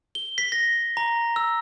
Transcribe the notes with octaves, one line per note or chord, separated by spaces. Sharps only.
G7
B6
A#6
A#5
E6